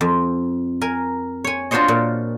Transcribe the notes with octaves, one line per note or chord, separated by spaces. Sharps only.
F2
A#4 G#5
C#5 G#5
D4 F4 F#4 C5 C#5 D#5
A#2